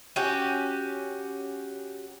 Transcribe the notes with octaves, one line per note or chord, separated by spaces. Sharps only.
C#4 F#4 G4